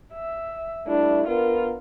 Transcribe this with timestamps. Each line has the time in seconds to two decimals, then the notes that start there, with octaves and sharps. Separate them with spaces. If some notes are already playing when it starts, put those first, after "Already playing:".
0.13 E5
0.87 G3 A3 D4 E4
1.28 B3 F4 A#4